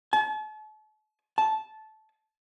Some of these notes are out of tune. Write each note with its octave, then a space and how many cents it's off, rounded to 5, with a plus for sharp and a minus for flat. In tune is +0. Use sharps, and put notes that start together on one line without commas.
A5 -40
A5 -15